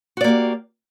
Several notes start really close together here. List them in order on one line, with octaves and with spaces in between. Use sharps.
F#4 D5 A#3 G4